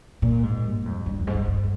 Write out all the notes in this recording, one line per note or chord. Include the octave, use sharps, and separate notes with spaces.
A#2
G#2
G2
F2
G2
F2
G#2
G2
G2